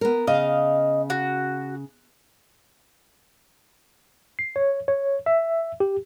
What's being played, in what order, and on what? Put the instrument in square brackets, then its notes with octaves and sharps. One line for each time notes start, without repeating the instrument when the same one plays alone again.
[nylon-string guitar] B3 A#4
[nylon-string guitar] C#3 [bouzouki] D#5 F5
[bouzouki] F#4
[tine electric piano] C7
C#5
C#5
E5
G4